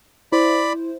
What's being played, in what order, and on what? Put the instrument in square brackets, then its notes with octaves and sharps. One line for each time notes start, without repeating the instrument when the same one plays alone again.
[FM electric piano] E4 C5 [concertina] D5 B5